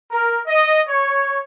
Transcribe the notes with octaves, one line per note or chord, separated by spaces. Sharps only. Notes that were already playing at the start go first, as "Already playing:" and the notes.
A#4
D#5
C#5